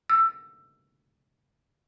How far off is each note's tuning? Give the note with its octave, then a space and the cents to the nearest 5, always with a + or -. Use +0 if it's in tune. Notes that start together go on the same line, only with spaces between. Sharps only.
E6 +20